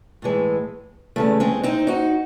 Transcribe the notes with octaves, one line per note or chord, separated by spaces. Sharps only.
A2 E3 G#3
E2 C#3 G#3 A3
G#3 C4
C4 D#4
D#4 F#4